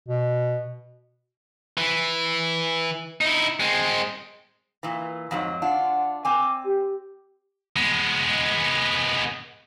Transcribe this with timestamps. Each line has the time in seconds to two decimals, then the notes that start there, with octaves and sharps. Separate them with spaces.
0.08 B2
1.77 E3
3.21 D#4 E4
3.60 G#3 C4
4.83 A#2 E3
5.31 F2 G#2 F#3
5.62 D4 F4 F#5
6.25 C4 G#5 D6
6.65 G4
7.76 G#3 B3